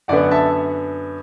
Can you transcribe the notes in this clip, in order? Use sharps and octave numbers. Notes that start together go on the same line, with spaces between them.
F#2 D3 B3 D5 F#5
E5 A5